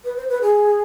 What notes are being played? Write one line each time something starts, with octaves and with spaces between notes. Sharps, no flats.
B4
C5
B4
G#4